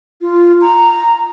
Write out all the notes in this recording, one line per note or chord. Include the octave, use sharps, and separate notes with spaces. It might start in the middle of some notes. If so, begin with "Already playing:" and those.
F4
A#5